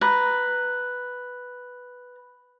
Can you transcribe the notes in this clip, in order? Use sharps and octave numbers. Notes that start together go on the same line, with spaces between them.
B4 A#5